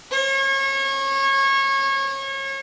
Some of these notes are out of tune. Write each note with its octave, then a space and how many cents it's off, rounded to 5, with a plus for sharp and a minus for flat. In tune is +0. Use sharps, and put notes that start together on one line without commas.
C#5 -30